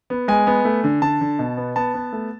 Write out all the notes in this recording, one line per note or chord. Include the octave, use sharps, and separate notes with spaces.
B3
G#3 G#5
B3
A3
D3
D3 A5
D3
B2
B3
B3 A5
B3
A3